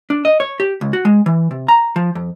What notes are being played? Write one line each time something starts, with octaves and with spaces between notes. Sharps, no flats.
D4
D#5
C#5
G4
C#2
F#4
G#3
E3
C3
A#5
F3
F2